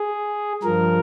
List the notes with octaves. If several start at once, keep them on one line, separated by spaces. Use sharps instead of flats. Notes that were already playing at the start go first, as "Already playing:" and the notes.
Already playing: G#4
G2 F3 A#4